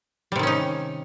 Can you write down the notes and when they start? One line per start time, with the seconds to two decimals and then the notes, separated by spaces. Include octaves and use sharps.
0.32 G3
0.36 C3
0.39 D#3
0.43 C#4
0.47 D#4